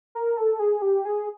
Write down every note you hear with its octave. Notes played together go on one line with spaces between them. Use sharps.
A#4
A4
G#4
G4
G#4